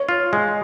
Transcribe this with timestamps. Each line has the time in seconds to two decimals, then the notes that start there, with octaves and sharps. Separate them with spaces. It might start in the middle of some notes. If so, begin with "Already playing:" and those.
Already playing: C#5
0.09 F4
0.33 G#3